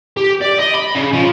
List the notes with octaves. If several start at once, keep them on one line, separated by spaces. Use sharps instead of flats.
G4
D5
D#5
B5
C#3
F3